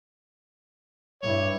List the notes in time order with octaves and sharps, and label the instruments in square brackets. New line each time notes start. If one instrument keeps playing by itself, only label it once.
[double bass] G2 E4 [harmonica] C#5